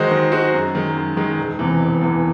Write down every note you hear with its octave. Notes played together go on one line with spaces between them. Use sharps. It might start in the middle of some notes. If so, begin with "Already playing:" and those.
Already playing: D#3 G#3 D#4 F#4 C5
D#3
G#3 D#4 F#4 C5
F#2
D#3 G#3
F#2
D#3 G#3
E1
E2 C3 E3
E1
E2 C3 E3